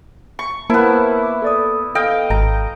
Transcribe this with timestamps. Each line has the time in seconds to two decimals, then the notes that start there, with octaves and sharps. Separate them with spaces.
0.39 C#6
0.70 A#3 B3 E4 A#4 C5 A5
1.23 D6
1.42 A4 D5 D#6
1.95 A4 D#5 F5 G5
2.30 G#1 A#5